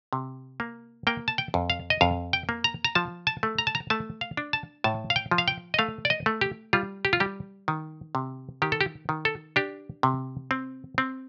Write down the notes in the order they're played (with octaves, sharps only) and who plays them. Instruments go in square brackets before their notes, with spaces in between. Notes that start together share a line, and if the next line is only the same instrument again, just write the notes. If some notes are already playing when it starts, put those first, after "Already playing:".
[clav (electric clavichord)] C3
A#3
A#3 G5
A5
G5
F2
F5
D#5
F2 F5
G5
A#3
A#5
A#5
F3 A5
A5
A3
A#5
A5
A#5
A3 A5
F5
D4
A5
A2 A5
F5
G5
F3
F5
G5
D#5
A3 F5
D5
D#5
A3
G4
G3 F4
G4
F4
G3 G4
D#3
C3
D#3 G4
A4
G4
D#3
A4
D4 G4
C3
C4
C4